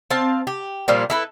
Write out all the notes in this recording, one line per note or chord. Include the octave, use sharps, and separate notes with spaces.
C4 F5 A5
G4
A#2 F3 G3 A#3
E4 A4 B4